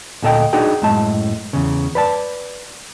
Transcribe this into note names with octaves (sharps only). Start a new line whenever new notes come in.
D2 A#2 A4 D#5 G5
D4 D#4 F#4 G#4 G5
F#2 A2 G#3 A5
E2 C#3
B4 D5 A5